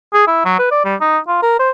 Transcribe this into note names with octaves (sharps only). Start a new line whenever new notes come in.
G#4
E4
F#3
B4
D5
G3
D#4
F4
A#4
C5